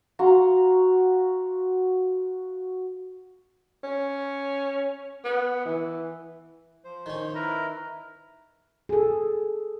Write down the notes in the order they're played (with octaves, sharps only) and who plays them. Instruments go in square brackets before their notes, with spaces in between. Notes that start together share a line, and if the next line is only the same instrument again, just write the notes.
[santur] F#4 F5 A#5 C6
[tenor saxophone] C#4
B3
E3
[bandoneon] F3 C5
[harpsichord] D#3 C#4
[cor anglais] E4 [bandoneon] A#4 B4 A#5
[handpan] G#4 A4